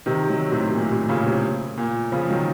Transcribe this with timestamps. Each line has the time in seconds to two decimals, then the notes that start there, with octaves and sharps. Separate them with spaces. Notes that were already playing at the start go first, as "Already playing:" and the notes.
0.06 C3 D#3
0.29 D#3 F#3
0.52 A2 C3
0.75 A#2
0.92 A2 C3
1.09 A#2 C#3
1.26 A2 C3
1.78 A#2
2.12 C#3 F3
2.29 D#3 F#3